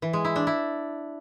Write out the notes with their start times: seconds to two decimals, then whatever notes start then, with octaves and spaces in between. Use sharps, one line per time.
0.02 E3
0.13 G#3
0.25 E4
0.36 D4
0.47 E4